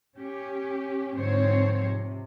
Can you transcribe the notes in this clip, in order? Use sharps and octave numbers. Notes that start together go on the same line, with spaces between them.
C#4 G4
G#2 D3 F3 C4 C5 C#5
C3